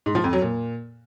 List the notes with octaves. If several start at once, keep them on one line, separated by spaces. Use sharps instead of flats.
G#2
F3
F2
F#3
A#2